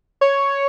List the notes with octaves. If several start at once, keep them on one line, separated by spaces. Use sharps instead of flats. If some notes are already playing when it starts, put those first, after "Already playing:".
C#5